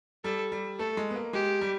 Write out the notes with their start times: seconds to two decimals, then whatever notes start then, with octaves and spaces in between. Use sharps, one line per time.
0.24 G3 A4
0.52 G3
0.79 A3 A4
0.97 G#3
1.10 B3
1.16 A#3
1.33 G#3 G4
1.61 G3